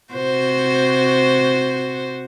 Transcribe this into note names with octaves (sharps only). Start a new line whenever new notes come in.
C3 F#4 C5